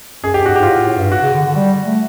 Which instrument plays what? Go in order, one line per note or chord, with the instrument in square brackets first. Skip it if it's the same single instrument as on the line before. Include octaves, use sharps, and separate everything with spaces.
[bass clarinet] F#2 [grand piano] G#4
[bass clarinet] F#2 [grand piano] G4
[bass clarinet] G#2 [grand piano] F#4
[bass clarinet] G#2 [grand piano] G4
[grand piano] F4
[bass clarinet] A2 [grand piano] F#4
[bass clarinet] A2
G2
[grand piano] F#4
[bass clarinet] C#3
D3
D3
G3
A3